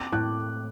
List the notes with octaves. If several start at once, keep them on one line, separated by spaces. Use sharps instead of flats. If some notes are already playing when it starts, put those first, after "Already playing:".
Already playing: C4 D6
A2 F#6